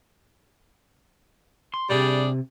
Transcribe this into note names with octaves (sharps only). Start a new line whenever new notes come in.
C6
C#2 C3 G3 D4 G#4